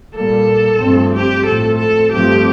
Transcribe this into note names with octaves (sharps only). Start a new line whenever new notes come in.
A#2 G3 A#3 A4
G2 F3 A3 C4
G4
A2 F3 A3 C4 A4
A4
G2 F3 A3 C4 G4